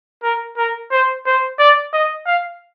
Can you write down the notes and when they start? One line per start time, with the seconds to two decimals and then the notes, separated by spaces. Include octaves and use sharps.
0.24 A#4
0.57 A#4
0.92 C5
1.26 C5
1.59 D5
1.93 D#5
2.26 F5